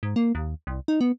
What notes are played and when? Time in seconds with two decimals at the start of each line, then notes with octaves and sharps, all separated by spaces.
0.03 G#2
0.16 A#3
0.35 D#2
0.67 C2
0.88 D#4
1.01 B3